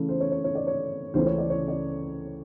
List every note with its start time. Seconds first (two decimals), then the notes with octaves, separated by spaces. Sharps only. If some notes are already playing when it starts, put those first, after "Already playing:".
Already playing: C#3 E3 A3
0.09 C5
0.20 C#5
0.32 C#5
0.44 C#5
0.55 D5
0.67 C#5
1.14 C#2 C#3 E3 A3 C#4 C5
1.26 C#5
1.38 D5
1.50 C#5
1.68 D5